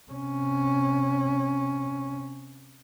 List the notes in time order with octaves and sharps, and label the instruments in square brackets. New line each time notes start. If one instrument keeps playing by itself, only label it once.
[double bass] C3 C#4